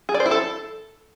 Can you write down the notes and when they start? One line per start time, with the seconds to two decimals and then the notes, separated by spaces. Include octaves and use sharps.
0.09 G#4
0.14 D5
0.20 C5
0.26 E4
0.31 A4